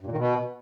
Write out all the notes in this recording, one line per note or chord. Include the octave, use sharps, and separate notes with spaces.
G2
A#2
D#3
B2